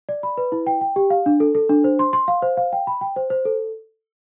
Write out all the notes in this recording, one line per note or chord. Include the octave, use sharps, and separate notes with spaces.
D5
B5
B4
E4
G5
G5
G4
F5
D4
A4
A4
D4
C5
C6
C6
F5
C5
F5
G5
B5
G5
C5
C5
A4